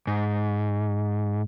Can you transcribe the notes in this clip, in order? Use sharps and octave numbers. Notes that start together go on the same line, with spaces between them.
G#2